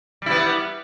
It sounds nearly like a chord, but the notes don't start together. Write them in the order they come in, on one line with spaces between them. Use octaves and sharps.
G3 E4 B3